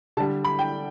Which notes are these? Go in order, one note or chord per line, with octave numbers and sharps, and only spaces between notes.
D3 G3 A5
B5
G5